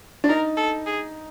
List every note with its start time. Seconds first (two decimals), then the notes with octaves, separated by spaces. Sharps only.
0.24 D4
0.29 D#4 A#4
0.57 A4
0.86 G#4